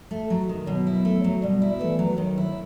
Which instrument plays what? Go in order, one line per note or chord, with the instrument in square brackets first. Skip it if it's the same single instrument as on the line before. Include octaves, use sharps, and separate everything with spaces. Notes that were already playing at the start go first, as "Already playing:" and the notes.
[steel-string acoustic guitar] A3
F#3
D#3
[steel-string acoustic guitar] B2 [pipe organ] F#3
[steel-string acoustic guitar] E4
A3
F#3
[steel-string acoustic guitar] B2 [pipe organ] G3
[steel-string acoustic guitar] E4
[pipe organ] E3 [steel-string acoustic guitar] A3
[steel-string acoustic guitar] F#3
[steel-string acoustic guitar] D#3 [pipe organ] F#3
[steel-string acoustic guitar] E4